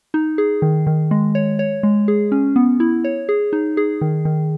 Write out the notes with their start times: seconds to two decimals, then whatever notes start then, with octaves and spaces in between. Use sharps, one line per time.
0.14 D#4
0.38 G#4
0.62 D#3
0.87 D#3
1.11 G#3
1.35 C#5
1.59 C#5
1.83 G#3
2.08 G#4
2.32 C#4
2.56 B3
2.80 E4
3.04 C#5
3.29 G#4
3.53 D#4
3.77 G#4
4.01 D#3
4.25 D#3